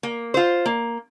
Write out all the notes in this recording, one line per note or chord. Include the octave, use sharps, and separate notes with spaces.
A#3
F4 C5
A#3